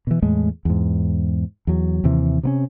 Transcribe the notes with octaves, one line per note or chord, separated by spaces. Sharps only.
B2 E3
E2 A2 G#3 A3
E2 G#2
E2 F#3
D#2 C3 E3
C3 B3 C#4